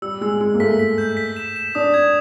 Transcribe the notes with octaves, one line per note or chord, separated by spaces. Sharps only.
G3 E6
G#3 E6
G#3 E6
A#3
A3 B6
B6
G6
B6
E7
E7
D4 D#6
G#6